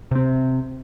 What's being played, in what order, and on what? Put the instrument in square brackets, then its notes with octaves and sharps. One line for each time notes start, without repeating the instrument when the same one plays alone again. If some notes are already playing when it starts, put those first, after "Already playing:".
[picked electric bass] C3 C4